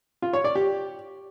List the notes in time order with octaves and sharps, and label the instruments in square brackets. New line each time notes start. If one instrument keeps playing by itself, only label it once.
[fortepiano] F4
C#5
D5
G4